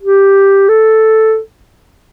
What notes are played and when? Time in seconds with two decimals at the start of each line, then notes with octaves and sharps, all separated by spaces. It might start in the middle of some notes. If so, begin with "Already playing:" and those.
0.02 G4
0.69 A4